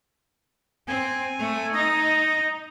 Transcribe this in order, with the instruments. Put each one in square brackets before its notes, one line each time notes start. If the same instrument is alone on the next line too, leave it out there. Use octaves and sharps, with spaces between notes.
[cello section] C4 [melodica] G#5
[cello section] A3
[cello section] D#4 [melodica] D#5